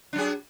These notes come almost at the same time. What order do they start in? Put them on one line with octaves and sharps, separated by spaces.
D4 F#3 G#4